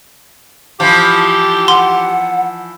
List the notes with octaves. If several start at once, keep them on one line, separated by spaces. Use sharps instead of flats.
E3 F3 G4
F#5 C6